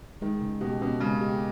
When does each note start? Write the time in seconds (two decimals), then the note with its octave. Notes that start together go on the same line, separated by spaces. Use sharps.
0.22 D#3 G#3
0.42 C#3
0.61 B2 G4
0.82 B2 C#4
1.00 C#3 G#3
1.21 G4